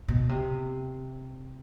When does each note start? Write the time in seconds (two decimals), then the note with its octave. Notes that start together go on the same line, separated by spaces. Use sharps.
0.08 B2
0.29 C3